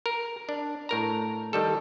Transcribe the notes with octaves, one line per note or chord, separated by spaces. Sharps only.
A#4
D4
A2 A#4 A#5
D#3 G3 A4